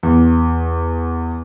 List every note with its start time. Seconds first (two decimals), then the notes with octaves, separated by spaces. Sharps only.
0.03 E2